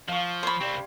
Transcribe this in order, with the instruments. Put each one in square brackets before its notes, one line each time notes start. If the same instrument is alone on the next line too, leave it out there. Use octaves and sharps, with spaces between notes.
[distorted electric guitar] F3 [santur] F5 C#6
[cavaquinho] C5 B5 [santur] C#5 C6
[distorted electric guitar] C2 C4 [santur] G4 D5